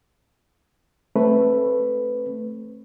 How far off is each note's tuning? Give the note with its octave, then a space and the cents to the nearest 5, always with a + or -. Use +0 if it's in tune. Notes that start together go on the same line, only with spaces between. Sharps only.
A3 +0 C4 +30 B4 +0